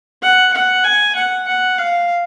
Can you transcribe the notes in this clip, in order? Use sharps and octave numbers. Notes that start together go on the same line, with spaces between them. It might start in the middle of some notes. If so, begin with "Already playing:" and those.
F#5
F#5
G#5
F#5
F#5
F5